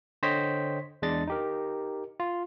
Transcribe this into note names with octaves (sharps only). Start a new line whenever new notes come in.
D3 C5 C#5 D#5 G5 B6
E2 G#3 D4 D#5 A6
D#4 G4 A#4
F4